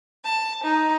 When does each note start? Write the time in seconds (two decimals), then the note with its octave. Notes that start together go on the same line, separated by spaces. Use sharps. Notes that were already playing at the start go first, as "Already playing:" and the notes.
0.24 A5
0.62 D#4